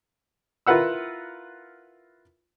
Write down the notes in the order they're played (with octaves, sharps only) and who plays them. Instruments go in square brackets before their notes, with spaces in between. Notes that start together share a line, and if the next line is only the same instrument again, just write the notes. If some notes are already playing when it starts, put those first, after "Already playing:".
[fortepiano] E4 F4 A#4 B4 F#5 E6